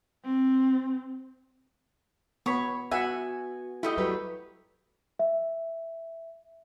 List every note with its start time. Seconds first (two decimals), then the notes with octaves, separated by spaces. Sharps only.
0.24 C4
2.46 B3 C#5 B5
2.92 B3 F#4 E5 F#5 G#5
3.83 A3 E4 G4 D#5
3.98 F#3 G3 B4
5.19 E5